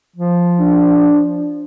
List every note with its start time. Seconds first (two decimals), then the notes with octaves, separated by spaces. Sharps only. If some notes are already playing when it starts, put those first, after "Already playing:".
0.16 F3
0.60 D4